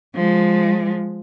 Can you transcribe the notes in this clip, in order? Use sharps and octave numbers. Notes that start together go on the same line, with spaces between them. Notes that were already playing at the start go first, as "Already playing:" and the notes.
F3 G#3